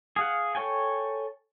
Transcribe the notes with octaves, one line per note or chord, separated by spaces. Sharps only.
G#4 F5 F#5
A4 C#5 G5 G#5